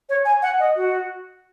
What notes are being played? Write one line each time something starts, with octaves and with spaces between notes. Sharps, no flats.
C#5
G#5
F#5
D#5
F#4